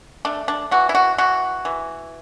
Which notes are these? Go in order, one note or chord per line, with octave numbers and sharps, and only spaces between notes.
A3 D4
D4
E3 F#4
E4
F#4
E3 F#4
E3